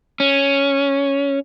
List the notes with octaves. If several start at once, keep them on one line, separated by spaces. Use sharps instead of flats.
C#4